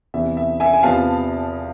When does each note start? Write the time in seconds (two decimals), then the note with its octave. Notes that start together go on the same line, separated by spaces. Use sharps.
0.14 E2 C3 E3 B3 E5
0.37 E5
0.60 E5 G#5
0.73 G#5
0.83 E2 C3 F3 B3 F5 A5